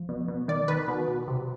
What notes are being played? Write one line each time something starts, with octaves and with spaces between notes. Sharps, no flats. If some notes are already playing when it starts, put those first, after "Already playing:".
Already playing: F3
B2
B2
D#3 D5
D#3 B4
B2
B2
C3